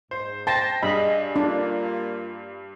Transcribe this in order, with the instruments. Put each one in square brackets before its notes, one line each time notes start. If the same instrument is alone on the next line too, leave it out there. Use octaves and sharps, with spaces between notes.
[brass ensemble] G#2 [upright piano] C5
[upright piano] C5 G5 A#6 [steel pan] A5
[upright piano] G2 [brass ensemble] G#4 D#5 [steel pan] B5
[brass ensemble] A#3 F4 [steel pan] D4